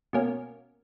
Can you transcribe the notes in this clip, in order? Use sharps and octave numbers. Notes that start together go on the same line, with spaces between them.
B2 A#3 C#4